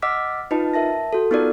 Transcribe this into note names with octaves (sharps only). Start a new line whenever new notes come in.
D#5 F#5 D6 E6 F6 B6
D#4 F4 B4 D#5 A5
A#4 E5 A5 A#6
F#4 A4
B3 D#4 F4 A4 A#4 D5